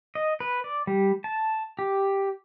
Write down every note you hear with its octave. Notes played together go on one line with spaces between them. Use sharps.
D#5
B4
D5
G3
A5
G4